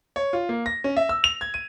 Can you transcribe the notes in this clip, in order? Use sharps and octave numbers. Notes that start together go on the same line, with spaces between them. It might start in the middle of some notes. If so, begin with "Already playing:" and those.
C#5
F4
A#3
A#6
C#4
E5
E6
F7
G#6
D#7